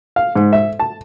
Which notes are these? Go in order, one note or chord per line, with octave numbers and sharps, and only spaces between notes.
F5
G#2
E5
A5